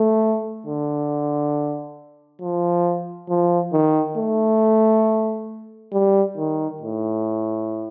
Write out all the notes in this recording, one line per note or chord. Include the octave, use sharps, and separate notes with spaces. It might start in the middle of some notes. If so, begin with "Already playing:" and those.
Already playing: A3
D3
F3
F3
D#3
A3
G3
D#3
A2